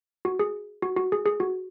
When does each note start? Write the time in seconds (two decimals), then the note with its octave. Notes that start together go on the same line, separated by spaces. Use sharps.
0.25 F#4
0.39 G#4
0.82 F#4
0.97 F#4
1.12 G#4
1.26 G#4
1.40 F#4